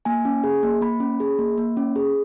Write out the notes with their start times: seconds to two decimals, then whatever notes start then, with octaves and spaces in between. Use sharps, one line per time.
0.05 A#3 G#5
0.25 C#4
0.44 G#4
0.63 A#3
0.82 A#3 B5
1.00 C#4
1.20 G#4
1.39 A#3
1.58 A#3
1.77 C#4
1.96 G#4